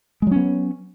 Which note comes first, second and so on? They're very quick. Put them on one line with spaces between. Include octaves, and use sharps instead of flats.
G#3 F#3 C#4 B3